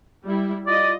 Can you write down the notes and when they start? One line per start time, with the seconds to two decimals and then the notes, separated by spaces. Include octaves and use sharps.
0.24 G3 E4
0.67 F4 D5 D#5